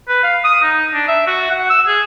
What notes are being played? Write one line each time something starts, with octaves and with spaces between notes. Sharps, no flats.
B4
F5
D#6
D#4
D4
E5
F#4
F#5
E6
G#4